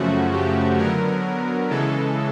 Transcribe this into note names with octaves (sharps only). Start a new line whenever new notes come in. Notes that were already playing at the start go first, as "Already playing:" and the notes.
Already playing: F#2 C#3 F3 A3 F#4
G4
D3 F#3 B3 A#4
C#3 E3 G#3 A4